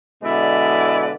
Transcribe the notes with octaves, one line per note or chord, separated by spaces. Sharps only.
B2 D3 G#3 E4 B4 D5